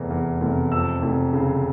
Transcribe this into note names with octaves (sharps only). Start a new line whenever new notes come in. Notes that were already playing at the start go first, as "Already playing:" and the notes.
Already playing: F1 E2
E2
F1
F2 E6
F1
C#3